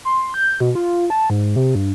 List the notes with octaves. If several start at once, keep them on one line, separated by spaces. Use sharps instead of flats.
C6
G6
B2
F4
A5
G#2
C3
G2